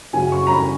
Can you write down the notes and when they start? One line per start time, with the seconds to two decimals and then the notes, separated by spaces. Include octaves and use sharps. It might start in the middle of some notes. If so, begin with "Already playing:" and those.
0.13 F#2 C#3 F#3 G#5
0.32 C#6
0.47 A#5
0.52 B5